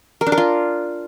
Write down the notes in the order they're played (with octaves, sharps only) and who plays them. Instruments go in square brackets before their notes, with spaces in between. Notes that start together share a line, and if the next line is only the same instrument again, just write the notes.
[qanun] A#4
D4
A#4
F4